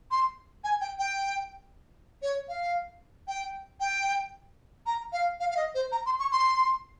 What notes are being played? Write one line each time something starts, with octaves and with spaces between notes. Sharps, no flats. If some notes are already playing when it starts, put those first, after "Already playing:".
C6
G#5
G5
G5
C#5
F5
G5
G5
A#5
F5
F5
F5
D#5
C5
A#5
C6
C#6
C6